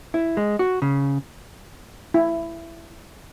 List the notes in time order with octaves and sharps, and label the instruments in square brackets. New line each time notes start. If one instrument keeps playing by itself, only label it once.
[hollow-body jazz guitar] E4
G#3
F#4
C#3
[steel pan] E4